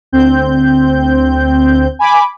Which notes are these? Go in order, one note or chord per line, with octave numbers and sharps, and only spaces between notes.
D2 C4 G6
G#5 B5 D6